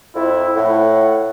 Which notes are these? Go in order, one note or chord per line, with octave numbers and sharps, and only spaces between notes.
F2 E4
A2 F#5